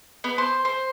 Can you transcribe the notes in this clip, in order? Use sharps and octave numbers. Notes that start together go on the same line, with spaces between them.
B3
C5
C5